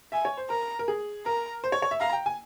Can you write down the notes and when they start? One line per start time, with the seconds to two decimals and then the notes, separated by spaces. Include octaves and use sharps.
0.12 E5 G#5
0.25 C#5
0.37 C5
0.50 A#4 A#5
0.79 A#4
0.88 G#4
1.26 A#4 A#5
1.64 C5
1.72 C#5
1.82 C#5
1.91 E5
2.00 F5 A#5
2.13 G5
2.26 G#5